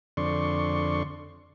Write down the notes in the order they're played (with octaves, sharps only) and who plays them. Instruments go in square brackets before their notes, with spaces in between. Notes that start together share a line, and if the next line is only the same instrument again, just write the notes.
[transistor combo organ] F2 D3 D5 C6 C#6